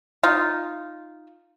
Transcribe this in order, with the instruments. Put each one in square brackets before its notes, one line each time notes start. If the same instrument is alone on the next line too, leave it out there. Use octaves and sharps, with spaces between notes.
[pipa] D#4 F4